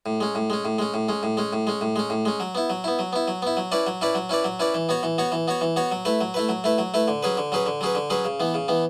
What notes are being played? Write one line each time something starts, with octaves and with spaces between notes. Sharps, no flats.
A2
G#3 C#4
A2
G#3 C#4
A2
G#3 C#4
A2
G#3 C#4
A2
G#3 C#4
A2
G#3 C#4
A2
G#3 C#4
A2
G#3 C#4
F#3
B3 E4
F#3
B3 E4
F#3
B3 E4
F#3
B3 E4
F#3
C#4 E4 B4 D5
F#3
C#4 E4 B4 D5
F#3
C#4 E4 B4 D5
F#3
C#4 E4 B4 D5
E3
B3 F#4 C#5
E3
B3 F#4 C#5
E3
B3 F#4 C#5
E3
B3 F#4 C#5
F#3
A3 E4 B4
F#3
A3 E4 B4
F#3
A3 E4 B4
F#3
A3 E4 B4
D3
F#3 C#4 G#4 B4
D3
F#3 C#4 G#4 B4
D3
F#3 C#4 G#4 B4
D3
F#3 C#4 G#4 B4
C#3
E3 B3
C#3
E3 B3